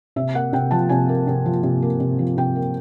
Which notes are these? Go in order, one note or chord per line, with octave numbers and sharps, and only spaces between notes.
C3 E5
A#3 F#5
C3 G5
F3 A5
C3 G#5
A#3
C3
F3
C3
A#3
C3
F3
C3 G5
A#3